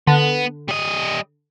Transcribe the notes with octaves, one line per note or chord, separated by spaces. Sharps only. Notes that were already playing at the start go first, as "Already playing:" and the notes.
D3 B3
G3 D#5